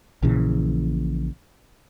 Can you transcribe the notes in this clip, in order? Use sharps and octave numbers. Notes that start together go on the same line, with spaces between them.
A#1 A#2 C#3 E3